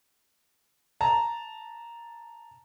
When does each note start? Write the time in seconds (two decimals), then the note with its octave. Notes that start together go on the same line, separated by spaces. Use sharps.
1.01 A5 A#5